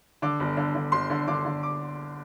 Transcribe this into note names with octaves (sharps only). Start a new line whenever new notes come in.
D3 D6
G1
D3
D3
G1 C6
D3
D3 D6
D3
D6